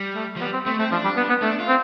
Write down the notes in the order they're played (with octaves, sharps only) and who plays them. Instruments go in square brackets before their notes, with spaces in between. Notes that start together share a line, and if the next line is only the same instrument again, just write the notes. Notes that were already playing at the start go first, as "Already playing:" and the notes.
Already playing: [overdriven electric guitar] G3
[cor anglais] A3
[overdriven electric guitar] F3
[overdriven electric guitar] G3 [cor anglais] B3
[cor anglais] C4
[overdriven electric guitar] A3 [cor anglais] C4
[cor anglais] A3 [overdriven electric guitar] C4
[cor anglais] F3 [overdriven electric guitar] D4
[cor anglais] G3
B3
B3
[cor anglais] A3 [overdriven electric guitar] D4
[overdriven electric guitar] F4
[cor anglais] C4